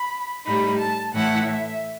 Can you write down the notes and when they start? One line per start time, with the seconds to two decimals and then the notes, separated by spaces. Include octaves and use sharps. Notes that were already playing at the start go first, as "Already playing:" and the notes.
Already playing: B5
0.46 A2 G3 D#4 B5
0.79 A5
1.14 A2 E3 A3 E4 F#5
1.49 E5